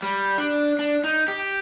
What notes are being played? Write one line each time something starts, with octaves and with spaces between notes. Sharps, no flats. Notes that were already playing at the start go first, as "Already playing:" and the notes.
G3
D4
D4
D#4
G4